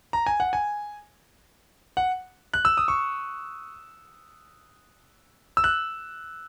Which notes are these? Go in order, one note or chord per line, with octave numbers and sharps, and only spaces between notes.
A#5
G#5
F#5
G#5
F#5
F#6
E6
D#6
C#6
E6
F#6